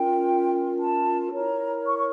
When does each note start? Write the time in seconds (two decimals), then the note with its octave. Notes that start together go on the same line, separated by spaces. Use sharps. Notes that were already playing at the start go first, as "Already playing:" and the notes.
Already playing: C#4 F4 A#4 G5
0.78 A5
1.31 E4 A#4 C#5 A#5
1.85 C#6
1.97 C#6